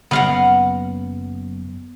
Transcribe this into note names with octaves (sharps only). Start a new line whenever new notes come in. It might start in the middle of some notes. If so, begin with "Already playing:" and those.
F#1 F#2 B3 F5 F#5